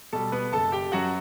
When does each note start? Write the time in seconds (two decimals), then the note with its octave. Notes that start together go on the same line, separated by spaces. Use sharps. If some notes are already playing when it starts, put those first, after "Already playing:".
0.13 B2 G3 A4 A5
0.32 B3 B4
0.52 F#1 A4 A5
0.72 G4 G5
0.92 F#2 F#3 F#4 F#5